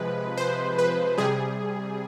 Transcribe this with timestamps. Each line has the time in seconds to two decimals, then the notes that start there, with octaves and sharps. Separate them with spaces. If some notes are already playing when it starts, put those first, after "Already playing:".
Already playing: C3 F3 G#3 B4
0.38 C5
0.78 B4
1.18 C3 G3 G#4